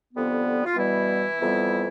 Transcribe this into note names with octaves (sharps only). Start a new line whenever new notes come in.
F2 D3 G3 B3
F4
B2 E3 G3 B3 E4
F2 E3 G3 B3